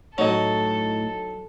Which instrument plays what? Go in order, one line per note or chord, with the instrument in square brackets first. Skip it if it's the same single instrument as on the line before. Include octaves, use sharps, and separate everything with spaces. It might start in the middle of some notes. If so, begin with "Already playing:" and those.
[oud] A2 [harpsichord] F#3 [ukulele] D#4 D#5 [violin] A4